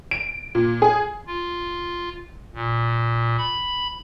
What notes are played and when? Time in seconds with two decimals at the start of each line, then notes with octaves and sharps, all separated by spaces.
0.11 D7
0.55 A#2
0.82 G#4
1.27 F4
2.54 A#2
3.38 B5